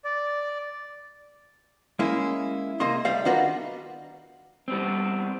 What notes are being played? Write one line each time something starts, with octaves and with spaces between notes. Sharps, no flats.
D5
G#3 A#3 C#4 E4
C3 A#3 A#4 D#5 C6
G3 A3 F5
D#3 D4 F4 F#4 A#4 B4
G3 B3 C4